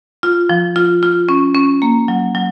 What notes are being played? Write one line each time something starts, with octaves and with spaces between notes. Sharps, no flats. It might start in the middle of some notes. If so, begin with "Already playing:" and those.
F4
F3
F4
F4
C#4
C#4
A#3
F#3
F#3